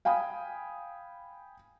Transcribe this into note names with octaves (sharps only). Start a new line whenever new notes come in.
F5 G5 G#5 B5 D#6